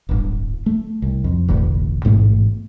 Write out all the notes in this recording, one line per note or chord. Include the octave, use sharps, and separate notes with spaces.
D1 G1
A3
C2
F2
E1 A1 D2
A1 G#2 B2 A3